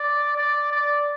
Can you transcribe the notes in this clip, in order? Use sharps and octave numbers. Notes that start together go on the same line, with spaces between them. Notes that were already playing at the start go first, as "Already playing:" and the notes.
Already playing: D5
D5
D5